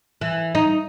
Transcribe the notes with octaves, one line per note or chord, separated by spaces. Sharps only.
E3
D#4